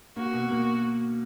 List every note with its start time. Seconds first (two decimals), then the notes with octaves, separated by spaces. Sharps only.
0.16 A#3 F#4
0.33 B2
0.51 A#3